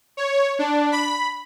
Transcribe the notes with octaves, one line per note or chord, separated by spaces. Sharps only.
C#5
D4
B5